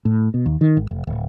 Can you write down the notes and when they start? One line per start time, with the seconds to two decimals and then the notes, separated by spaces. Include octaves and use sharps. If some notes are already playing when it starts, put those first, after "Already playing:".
0.05 A2
0.34 B2
0.46 D#2
0.61 D#3
0.77 G#1
0.91 F1
1.07 D1